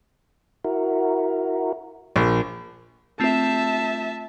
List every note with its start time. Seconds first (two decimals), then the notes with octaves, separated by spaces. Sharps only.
0.64 E4 F#4 A#4
2.16 A#1
3.20 A3 C4 F4 E5 A5